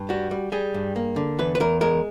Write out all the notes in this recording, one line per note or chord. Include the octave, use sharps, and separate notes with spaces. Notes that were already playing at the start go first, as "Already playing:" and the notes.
Already playing: G2
G3 F#4
G3
G3 G#4
G2
A#3
D3
E2 B4
B4
E2 A#4
G#3 A#4